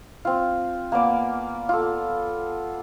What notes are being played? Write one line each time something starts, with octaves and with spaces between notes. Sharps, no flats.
C4 F4
A#3 B3 D5 G#5
F4 A4